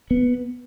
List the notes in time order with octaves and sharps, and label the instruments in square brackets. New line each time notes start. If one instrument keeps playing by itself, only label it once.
[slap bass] B3